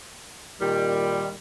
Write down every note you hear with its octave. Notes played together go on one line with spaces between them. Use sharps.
A#2 D#3 G3